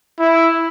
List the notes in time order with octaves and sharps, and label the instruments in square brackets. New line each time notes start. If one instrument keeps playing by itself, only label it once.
[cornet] E4